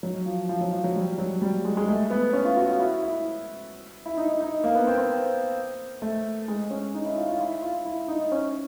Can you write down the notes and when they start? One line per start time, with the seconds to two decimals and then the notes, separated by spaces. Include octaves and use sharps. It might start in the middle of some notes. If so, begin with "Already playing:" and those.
0.03 F#3
0.26 F3
0.49 F3
0.61 F#3
0.72 F3
0.84 F#3
0.96 G3
1.18 F#3
1.42 G3
1.65 G#3
1.77 G#3
1.88 A3
2.10 B3
2.33 C#4
2.45 F4
2.57 F#4
2.68 F4
2.79 E4
3.03 E4
4.06 E4
4.18 D#4
4.41 D#4
4.64 A#3
4.75 B3
4.87 C4
4.98 C4
6.02 A3
6.48 G#3
6.70 C#4
6.94 D#4
7.05 E4
7.16 F4
7.28 F4
7.40 E4
7.62 F4
7.85 E4
8.08 D#4
8.32 C#4